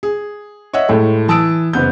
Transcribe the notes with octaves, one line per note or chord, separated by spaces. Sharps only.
G#4
C#5 D#5 E5 F#5
A2 G#3 A3
E3 A5 D#6 E6 D7
F#1 B3 G6